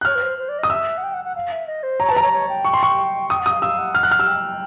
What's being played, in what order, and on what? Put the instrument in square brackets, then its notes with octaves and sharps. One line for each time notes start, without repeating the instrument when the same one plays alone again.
[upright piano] F#6
[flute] C#5 [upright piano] F6
[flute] B4
C5
C5
D5
[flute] D#5 [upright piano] D#6
[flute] E5 [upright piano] E6
[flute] F#5
G5
F#5
F#5
F5
E5
D#5
C5
[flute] C#5 [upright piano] A#5
[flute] B4 [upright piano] A5
[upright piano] A#5
[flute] C#5
C#5
G5
[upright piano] C#6
C6
C#6
[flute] G5 [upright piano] D#6
[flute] F#5
[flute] F5 [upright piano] D#6
[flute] F5 [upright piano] E6
[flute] F#5
[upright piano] F6
F#6
F6
E6
[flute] G5